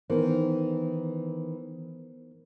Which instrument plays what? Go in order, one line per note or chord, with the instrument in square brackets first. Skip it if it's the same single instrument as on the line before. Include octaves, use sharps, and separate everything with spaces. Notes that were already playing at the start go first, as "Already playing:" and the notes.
[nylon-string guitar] D#3 E3 [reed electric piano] B3 A#4 C5